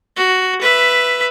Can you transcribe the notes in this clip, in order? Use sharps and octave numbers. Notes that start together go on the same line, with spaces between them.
F#4
B4 E5